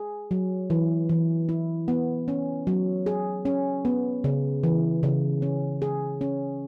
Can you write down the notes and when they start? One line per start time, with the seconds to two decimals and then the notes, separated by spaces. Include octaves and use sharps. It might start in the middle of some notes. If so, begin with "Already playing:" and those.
Already playing: G#4
0.31 F#3
0.70 E3
1.09 E3
1.49 E4
1.88 B3
2.28 C#4
2.67 F#3
3.06 G#4
3.45 C#4
3.85 B3
4.24 C#3
4.63 E3
5.03 C#3
5.42 C#4
5.82 G#4
6.21 C#4